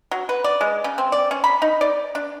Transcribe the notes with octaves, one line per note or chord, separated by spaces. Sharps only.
F#3
B4
D5
G#3
C#3
C4
D5
C#4
B5
D#4
D5
D4